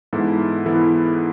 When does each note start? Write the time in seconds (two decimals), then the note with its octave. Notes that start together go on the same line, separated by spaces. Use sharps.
0.13 G#2 E3 B3 E4 A4
0.66 E3 B3 E4 A4